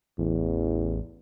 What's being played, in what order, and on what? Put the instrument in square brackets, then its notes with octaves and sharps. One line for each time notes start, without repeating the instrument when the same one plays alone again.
[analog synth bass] A1 [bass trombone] E2